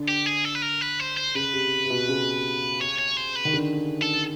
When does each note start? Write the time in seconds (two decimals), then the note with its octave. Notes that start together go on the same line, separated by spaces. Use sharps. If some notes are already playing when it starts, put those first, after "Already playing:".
Already playing: D3
0.08 G4
0.26 G#4
0.45 A4
0.55 B4
0.62 A#4
0.81 B4
1.00 C5
1.17 C5
1.35 C#3 B4
1.53 C3
1.84 C3
1.90 B2
2.08 C#3
2.81 C#5
2.99 C#5
3.17 C5
3.35 B4
3.45 D#3
3.53 D3
4.02 A4